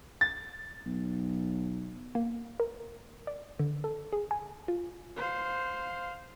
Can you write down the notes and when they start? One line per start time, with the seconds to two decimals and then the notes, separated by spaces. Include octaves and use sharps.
0.21 A6
0.86 B1
2.15 A#3
2.60 A#4
3.27 D5
3.59 D3
3.84 A4
4.13 G#4
4.31 G#5
4.68 F4
5.17 C5 F5